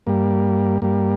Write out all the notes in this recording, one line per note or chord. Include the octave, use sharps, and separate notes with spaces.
G2 G3 A#3
G2 G3 A#3